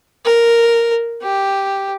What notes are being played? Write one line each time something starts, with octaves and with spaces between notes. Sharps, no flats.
A#4
G4